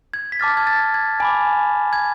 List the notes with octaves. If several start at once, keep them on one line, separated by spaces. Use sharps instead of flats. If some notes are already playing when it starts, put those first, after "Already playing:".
G#6
B6
A5 D6 F6 A6
G#6
A6
G#6
G#5 B5 D6
G#6